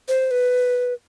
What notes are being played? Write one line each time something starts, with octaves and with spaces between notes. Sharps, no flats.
C5
B4